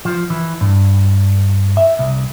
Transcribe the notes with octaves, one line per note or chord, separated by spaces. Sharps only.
F3
E3
G2
E5
C2